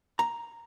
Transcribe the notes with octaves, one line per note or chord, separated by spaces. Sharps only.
A#5